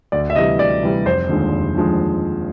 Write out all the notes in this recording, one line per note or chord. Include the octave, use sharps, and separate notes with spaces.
D2 D5
E5
C3 E3 G3 D#5
D2 D5
C3 E3 G3
F1 C5
D#2 D3 F3 G#3
F1
D#2 D3 F3 G#3